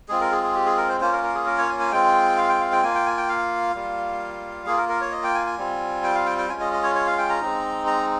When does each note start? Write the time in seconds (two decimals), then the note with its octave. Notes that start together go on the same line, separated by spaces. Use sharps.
0.09 G#3 C4 F4 G#4
0.21 A#4
0.32 G#4
0.43 G#4
0.55 G4
0.66 G#4
0.77 A#4
0.89 C5
1.01 A#3 C#4 F4 C5
1.12 A#4
1.23 A#4
1.35 G#4
1.46 A#4
1.58 C#5
1.69 G#5
1.80 G#5
1.92 G#3 C4 F4 G5
2.38 F5
2.49 G5
2.61 F5
2.72 G5
2.83 A#3 F4 G#5
2.95 G5
3.06 G#5
3.17 G5
3.29 F5
3.75 G3 A#3 F4
4.66 A#3 F4 G#4
4.78 A#4
4.89 A#4
5.01 C#5
5.12 D#5
5.24 G5
5.35 G#5
5.46 G#5
5.58 G3 C4 F4
6.04 G5
6.15 F5
6.26 G5
6.38 G5
6.49 G#3 C#4 F4 G#5
6.61 D#5
6.73 D#5
6.83 C#5
6.95 C#5
7.07 F5
7.18 G5
7.30 A#5
7.41 G#3 C4 D#4
7.86 A#5